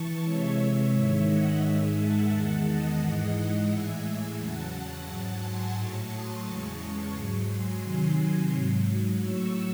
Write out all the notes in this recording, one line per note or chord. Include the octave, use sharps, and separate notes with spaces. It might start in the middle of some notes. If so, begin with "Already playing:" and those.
Already playing: E3 A5 C#6
C3 E3 G#3 C#5 E5
G#2 D#3 G#3
D#5 F#5
G#2 D#3 G#3 E5 G#5
F#5 A5
E2 D#3 G#3 F#5 A5
D#5 F#5
G#2 E3 G#3
A2 E3 G#3 E5 G#5
E5 G#5
E2 C#3 F#3 F#5 A5
F#5 A5
G#2 F#3 F#5 A5
G#5 C6
A2 F#3 A5 C#6
C6 D#6
E2 C#3 G#3 A5 C#6
G#2 F#3
G#5 C6
C3 D#3 F#3
G#2 F#3
A2 F#3 C#6 E6